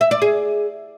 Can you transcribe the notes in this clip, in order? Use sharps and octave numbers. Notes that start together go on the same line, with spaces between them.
E5
D5
G#4